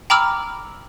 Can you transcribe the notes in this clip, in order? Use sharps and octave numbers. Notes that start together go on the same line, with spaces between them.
G5 A#5 B5 D6 E6 F6